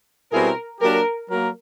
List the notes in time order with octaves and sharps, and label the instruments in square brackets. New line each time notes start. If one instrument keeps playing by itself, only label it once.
[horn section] B2 G3 C4 E4 G#4 [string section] A#4
[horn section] F#3 A#3 D4 G4 [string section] A#4
[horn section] F#3 A#3 A#4